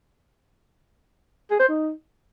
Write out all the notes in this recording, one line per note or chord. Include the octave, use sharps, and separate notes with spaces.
G#4
C5
D#4